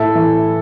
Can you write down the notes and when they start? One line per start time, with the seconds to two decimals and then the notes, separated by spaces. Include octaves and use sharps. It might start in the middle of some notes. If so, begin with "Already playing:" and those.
Already playing: A2 E4 A4
0.15 E3